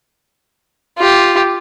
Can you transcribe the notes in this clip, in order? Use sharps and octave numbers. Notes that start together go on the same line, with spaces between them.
F4 G4